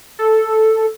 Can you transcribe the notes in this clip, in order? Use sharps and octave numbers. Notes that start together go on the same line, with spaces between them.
A4